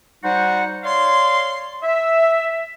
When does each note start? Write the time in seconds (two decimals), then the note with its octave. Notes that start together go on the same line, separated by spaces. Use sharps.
0.23 G3 D#4 F#4 C5 F#5
0.84 C#5 D5 F5 C6
1.82 E5